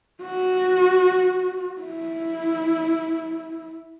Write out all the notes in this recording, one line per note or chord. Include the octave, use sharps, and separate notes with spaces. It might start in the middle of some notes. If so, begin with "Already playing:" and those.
F#4
E4